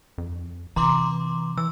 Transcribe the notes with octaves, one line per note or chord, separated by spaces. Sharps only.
F2
C3 E3 A#5 C6 D6
E3 E6